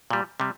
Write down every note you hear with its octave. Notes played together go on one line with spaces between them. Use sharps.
A#2 G3
C3 G3